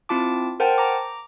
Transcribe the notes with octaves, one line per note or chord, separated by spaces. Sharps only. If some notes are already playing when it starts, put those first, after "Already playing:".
C4 E4 F4 A5 D6
A#4 C5 F#5 G5 A5
A#5 D6